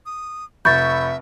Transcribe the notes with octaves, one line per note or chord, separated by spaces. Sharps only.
D#6
F1 E5 B5 C#6 G6 A6